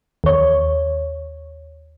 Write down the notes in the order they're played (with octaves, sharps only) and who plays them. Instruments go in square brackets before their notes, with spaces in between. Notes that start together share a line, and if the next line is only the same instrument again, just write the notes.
[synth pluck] D#2 C#5